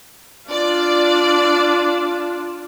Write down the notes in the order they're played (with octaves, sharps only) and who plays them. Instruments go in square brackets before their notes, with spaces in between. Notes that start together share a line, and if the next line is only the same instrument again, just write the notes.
[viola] D4 F4 [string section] D5